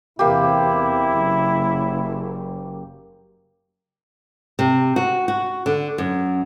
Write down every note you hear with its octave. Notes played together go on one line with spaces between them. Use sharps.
E2 C3 A#3 E4 G4
F#1
C3
F#4
F#4
D3
F#2